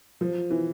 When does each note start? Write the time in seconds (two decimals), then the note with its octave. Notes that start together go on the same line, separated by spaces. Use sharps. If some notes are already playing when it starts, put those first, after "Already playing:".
0.21 F3
0.50 E3